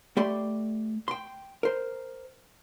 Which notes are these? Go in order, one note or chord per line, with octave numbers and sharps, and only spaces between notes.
A3 G4 D5 B5 C6
G5 C6
A#4 C5